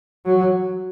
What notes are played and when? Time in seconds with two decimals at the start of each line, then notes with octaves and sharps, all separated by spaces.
0.26 F#3